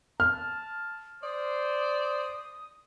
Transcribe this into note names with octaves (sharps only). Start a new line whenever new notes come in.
A5 F6
C5 D5 D#6